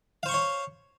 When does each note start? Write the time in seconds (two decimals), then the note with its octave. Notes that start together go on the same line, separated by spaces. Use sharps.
0.23 F5
0.26 C5
0.29 C#6
0.31 C6
0.34 C#5